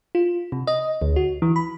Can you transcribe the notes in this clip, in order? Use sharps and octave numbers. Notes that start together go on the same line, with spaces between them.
F4
C3
D#5
D2
F#4
E3
B5